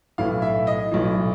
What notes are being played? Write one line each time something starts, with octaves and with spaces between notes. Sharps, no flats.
B1 A2 E3 F5
E5
D#5
B1 A2 E3